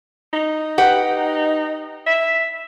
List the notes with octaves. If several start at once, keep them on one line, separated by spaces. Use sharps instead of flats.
D#4
G4 B4 F#5
E5